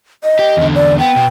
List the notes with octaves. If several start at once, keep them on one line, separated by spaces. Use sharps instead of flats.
D#5
G4
E2 D3
D5
B3 G5
B2